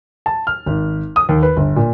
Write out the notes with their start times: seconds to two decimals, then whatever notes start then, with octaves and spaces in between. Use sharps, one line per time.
0.26 A5
0.47 F6
0.66 G#1
1.16 D#6
1.29 D#2
1.43 B4
1.57 G1
1.76 A#2